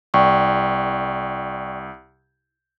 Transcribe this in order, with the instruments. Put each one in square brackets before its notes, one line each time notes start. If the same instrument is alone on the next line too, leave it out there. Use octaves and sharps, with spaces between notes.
[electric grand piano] C2 [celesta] D5 G5 C#6